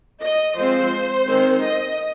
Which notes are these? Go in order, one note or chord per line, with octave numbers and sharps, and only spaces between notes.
D#5
F3 G#3 C4 C5
D#3 G#3 C4
D#5